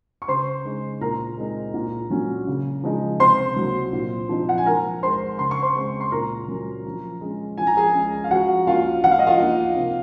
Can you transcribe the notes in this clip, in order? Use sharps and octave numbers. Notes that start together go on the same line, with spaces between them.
C#6
C#3 C5 C6
G#3 D#4
A#2 A#4 A#5
G#3 C4 D#4
A#2
F#3 A#3 C#4
C#3
F3 G#3 D#4
C3 C5 C6
F#3 A#3
A#2
F3 C4 D#4
F#5
G#5
F3 A#4 A#5
G#3 D#4 C5 C6
C#3 C6
C#6
C5 C6
G#3 C4
C6
A#2 A#4 A#5
F#3 C#4
F3
G#3 C#4
F3 G#5
A#5
G#4 G#5
G#3 C#4
F5
F3 F#4 F#5
A#3 C#4 F4 F5
F3 F#5
F5
D#5
F4 F5
A#3 D#4
C3